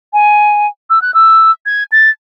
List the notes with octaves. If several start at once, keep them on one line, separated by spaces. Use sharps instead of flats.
G#5
E6
F#6
E6
G#6
A6